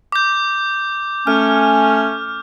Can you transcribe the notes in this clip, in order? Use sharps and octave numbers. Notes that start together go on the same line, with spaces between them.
D6 G6
A3 C#4 F6